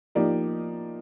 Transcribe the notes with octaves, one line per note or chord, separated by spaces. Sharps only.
F3 A#3 D#4 G4 D5